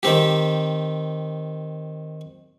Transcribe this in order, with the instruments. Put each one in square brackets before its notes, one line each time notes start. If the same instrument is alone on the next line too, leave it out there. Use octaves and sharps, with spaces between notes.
[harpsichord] D#3 C4 G4